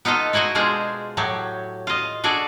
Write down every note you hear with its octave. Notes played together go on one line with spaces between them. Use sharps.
B3 D#4 F4 A4 D#5
D#4 E4 F#4 C5 D#5
B2 G#3 D4 F4 G#4 C5
A2 F#3 G4
F4 D#5
D4 F#4 G#4 A4 D5